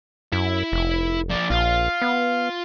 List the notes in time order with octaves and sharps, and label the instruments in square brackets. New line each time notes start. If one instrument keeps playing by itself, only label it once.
[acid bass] F#2 [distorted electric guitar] E4 E5
[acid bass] F1
[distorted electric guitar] F3 D4 [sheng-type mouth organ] D5
[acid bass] A#1 [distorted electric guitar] F4 [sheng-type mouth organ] F5
[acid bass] B3